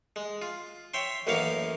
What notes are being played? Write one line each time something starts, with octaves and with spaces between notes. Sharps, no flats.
G#3
F4
C#5 E5 G5 C6
A1 F#2 A#3 E4 C#5 F5